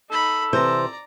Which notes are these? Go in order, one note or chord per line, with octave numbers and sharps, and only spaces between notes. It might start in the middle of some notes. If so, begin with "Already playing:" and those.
D#4 A4 B5
C3 E3 C5 D5 A#5